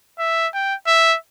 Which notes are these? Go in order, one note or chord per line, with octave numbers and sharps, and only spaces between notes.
E5
G5
E5